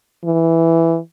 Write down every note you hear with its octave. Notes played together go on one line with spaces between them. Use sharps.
E3